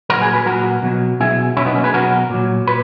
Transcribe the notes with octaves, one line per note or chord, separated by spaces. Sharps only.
A#2 F#3 F#4 A#4
G#4 B4
G#4 B4
A#2 F#3 F#4 A#4
B2 F#3
B2 F#3 E4 G#4
B2 F#3 C#4 E4
B3 D#4
A#3 C#4
G#4 B4
B2 F#3 F#4 A#4
A#2 F#3
A#2 B4